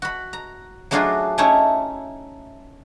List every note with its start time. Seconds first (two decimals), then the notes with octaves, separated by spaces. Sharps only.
0.02 F#4 B5
0.33 A#5
0.91 F#3 A3 D4 F4 F#4 G#4
1.38 A3 C#4 D#4 E4 C#5 A5